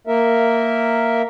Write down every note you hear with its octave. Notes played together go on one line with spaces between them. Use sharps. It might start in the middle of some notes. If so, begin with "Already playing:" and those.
A#3 A#4 E5